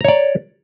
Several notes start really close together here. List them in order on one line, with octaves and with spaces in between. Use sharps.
A#5 C#5 D5